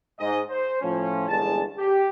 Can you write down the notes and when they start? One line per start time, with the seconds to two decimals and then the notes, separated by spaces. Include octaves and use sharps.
0.20 G#2 D#5
0.50 C5
0.82 A2 F3 C#4
1.29 G1 E2 G#3 G#4 A5
1.79 G4